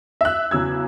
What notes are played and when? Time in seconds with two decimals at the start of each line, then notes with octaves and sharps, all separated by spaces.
0.21 E5 F#6
0.51 E2 C#3 F#3 E6 G#6